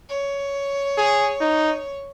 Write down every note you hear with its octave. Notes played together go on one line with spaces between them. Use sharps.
C#5
G#4
D#4